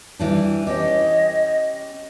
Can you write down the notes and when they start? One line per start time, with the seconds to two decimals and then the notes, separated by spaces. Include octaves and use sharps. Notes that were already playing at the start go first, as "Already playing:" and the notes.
0.19 E3 G3 D4
0.67 C#4 G4 D#5